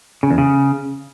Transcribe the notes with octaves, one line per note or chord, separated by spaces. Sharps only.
C#3
E2
C#3